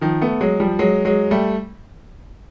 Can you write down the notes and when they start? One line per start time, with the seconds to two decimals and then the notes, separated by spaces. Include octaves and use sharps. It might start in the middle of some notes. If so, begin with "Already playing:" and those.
0.01 D#3 F3
0.21 A3 B3
0.41 F#3 G#3
0.60 F3 G3
0.79 F#3 G#3
1.05 F#3 G#3
1.31 G3 A3